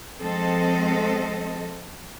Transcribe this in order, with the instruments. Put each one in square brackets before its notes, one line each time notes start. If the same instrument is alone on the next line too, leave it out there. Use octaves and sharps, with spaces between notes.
[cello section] F3 G#3 C4 A4 D#5